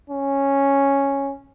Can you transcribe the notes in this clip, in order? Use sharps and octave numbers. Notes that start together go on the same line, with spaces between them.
C#4